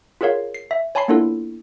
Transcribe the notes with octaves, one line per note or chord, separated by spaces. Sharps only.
F4 G#4 A#4 C#5 F5
C7
E5
C#5 G#5 A5 B5 C6 C7
A#3 B3 D4 E4 F4 A4